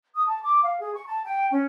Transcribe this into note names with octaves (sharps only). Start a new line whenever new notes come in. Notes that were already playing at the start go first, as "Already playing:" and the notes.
D#6
A5
D6
F5
G#4
C#6
A5
G5
C#4